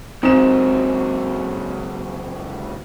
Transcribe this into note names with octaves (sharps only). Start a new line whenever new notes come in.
C#2 F#2 C4 D#4 E7